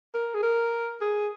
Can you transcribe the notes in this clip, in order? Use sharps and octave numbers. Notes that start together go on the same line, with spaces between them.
A#4
G#4
A#4
G#4